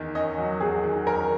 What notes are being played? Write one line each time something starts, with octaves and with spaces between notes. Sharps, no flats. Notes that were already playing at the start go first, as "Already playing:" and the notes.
Already playing: E2 D#3
C#4 D#5
F#3
E2 G#4
D#3
C#4 A#4